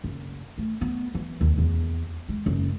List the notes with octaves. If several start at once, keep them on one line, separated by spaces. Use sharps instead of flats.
F#1
A3
B3
E3
D#2
E2
G#3
F#1